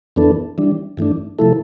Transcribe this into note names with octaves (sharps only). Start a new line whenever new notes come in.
F2 E3 B3 D4 A4
E3 G3 D4
G2 E3 A3 D4
C3 F3 A3 E4 A4